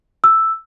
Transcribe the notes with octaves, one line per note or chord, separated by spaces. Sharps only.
E6